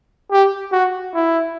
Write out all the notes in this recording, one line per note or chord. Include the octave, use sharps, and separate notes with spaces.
G4
F#4
E4